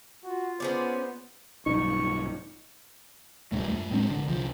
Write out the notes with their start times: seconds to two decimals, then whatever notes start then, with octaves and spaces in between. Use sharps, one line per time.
0.24 F4 F#4
0.60 B3 C#4 G#4 C5 D5
1.66 B1 G2 D#4 C#6
3.52 D#1 G2 A#2 A3
3.71 F#2 A3
3.91 A2 G#3 C4 D4
4.10 A#1 D3
4.28 C2 F3